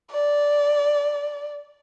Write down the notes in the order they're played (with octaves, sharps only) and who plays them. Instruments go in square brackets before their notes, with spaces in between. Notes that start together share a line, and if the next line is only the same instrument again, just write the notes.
[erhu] D5